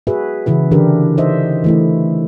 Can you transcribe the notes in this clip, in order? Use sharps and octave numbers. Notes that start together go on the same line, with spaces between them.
F#4 G#4 B4 E5
C#3 E3 E4 B4
D3 E3 D4 G4 A#4
D#4 C5 D#5 E5
E3 A3 E4